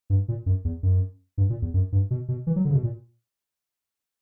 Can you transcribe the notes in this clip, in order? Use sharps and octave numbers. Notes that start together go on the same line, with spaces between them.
G2
A#2
F#2
E2
F#2
G2
A#2
E2
F#2
G2
B2
B2
E3
F#3
D3
C#3
B2
A#2